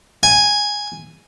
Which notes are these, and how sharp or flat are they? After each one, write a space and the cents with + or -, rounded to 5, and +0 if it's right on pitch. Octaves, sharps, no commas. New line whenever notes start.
G#5 -5